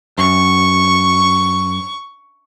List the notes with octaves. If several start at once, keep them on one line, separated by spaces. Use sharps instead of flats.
F#2 C#6